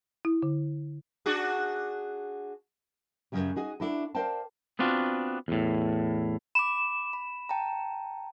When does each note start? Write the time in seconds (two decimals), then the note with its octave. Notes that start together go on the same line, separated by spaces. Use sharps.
0.25 E4
0.42 D3
1.26 D4 F#4 G#4
3.32 F#2 A2 C#3 F#3 G3
3.56 D#4 F#4 G#4
3.80 D4 E4 F#4 A4
4.15 A#4 C5 D5 F5 G5 A5
4.79 B3 C4 D4 F4 F#4
5.48 E2 A2
6.55 B5 D6 E7
7.13 B5
7.49 G5 A5 A#5